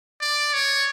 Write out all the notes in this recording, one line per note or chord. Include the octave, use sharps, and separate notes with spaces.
D5
C#5